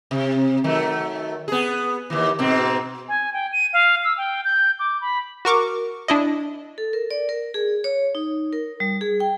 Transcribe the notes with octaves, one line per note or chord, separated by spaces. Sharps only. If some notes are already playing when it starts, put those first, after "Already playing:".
C3
D#3 F#3 A3
B3 G#4
D#2 E3
G#2 B2 C4
G#5
G5
D#7
F5
E6
G5
G6
D6
B5
F#4 A#4 C#6 D6
D4 E4 D#5
A4
A#4
D5
A#4
G#4
C#5
D#4
A#4
G3
G#4
G5